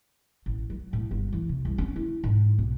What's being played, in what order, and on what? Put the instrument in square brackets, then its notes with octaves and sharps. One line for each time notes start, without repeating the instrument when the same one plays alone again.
[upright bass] A1
F#3
A2
G1
E3
C3
C2
C#4
E4
G#2
B1